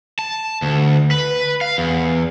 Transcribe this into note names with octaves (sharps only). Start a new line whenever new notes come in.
A5
D2
B4
F5
E2